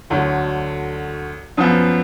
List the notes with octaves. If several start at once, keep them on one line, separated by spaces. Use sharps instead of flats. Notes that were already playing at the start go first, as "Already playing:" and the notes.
D2 D3 F#3
F#2 F3 B3